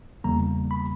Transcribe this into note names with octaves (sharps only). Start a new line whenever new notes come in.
E2 C#3 G3 A#3 A#5
B5